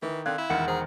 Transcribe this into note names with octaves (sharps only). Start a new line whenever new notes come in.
D#3 E3
D3 C4 F5 F#6 G#6
E4
E1 D#3 F#5 C#7
G#4 C5 A#5